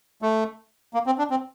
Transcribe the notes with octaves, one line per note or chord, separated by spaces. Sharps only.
A3
A#3
C4
D4
C4